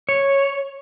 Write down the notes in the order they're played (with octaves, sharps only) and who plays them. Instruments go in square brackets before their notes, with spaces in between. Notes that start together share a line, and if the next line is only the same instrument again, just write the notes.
[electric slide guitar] C#5